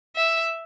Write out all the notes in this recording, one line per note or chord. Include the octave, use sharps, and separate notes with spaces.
E5